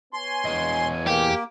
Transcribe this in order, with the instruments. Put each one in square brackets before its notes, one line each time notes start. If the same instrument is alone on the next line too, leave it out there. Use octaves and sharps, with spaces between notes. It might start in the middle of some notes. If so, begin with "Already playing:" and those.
[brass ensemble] B3 C#5 G#5 [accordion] C6
[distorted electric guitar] E2 D#5
[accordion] A#3 [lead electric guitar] G4